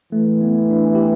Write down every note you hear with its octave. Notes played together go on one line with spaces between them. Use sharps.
E3 A3
B3
D4
G4